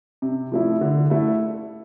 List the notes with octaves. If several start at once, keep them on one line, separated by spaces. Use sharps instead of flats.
C3
F3 A3 E4
D3
A3 E4